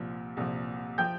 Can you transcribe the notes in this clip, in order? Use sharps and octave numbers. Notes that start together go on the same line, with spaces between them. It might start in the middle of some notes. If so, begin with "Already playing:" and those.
Already playing: C2 A#2 F3
C2 A#2 F3
F3 G5 G6